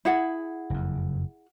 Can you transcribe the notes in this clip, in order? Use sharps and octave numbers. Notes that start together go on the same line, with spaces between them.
E4 G#4 F#5
F#1 F2